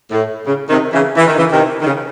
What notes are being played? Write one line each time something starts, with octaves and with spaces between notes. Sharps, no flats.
A2
C#3
C3 D#3
C#3 E3
E3
D#3
C#3 E3
C3 D#3
D#3
C#3